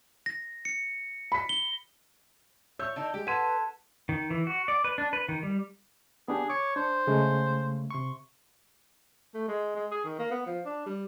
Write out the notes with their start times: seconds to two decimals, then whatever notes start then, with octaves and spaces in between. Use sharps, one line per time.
0.26 A#6
0.65 C#7
1.32 B5 B6
1.49 G7
2.79 C#5 E5 E6 G6
2.96 D3 D#4 A5
3.14 G#3 G4
3.27 A4 B4 F#5 C6 G#6 B6 D#7
4.09 D#3
4.30 E3
4.47 F#4
4.68 D5
4.84 B4
4.98 D4
5.13 B4
5.29 D#3
5.43 G3
6.28 B3 D4 G4 G#4
6.50 C#5 D6
6.76 D4 C5
7.07 C#3 G#3 A3
7.91 C3 C6 C#6
9.34 A3
9.48 G#3
9.76 G#3
9.91 G#4
10.05 D#3
10.19 A#3
10.31 B3
10.46 F3
10.66 D4
10.86 G3